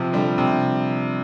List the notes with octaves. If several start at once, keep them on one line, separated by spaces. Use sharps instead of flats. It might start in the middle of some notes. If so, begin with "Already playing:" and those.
Already playing: C3 F3
D3 G3
C3